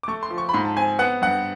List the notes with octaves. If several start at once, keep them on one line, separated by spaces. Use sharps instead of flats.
D6
A3 C#6
C6
F3
C#6
B5
G#2 C6
A5
C4 G#5
B3 F#5
G2 F#5